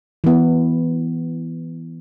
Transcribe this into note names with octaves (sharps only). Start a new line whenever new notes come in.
E3 B3